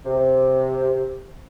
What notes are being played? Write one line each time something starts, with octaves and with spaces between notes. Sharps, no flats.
C3